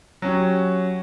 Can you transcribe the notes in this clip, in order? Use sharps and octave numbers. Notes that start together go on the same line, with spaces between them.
F#3 C#4 G4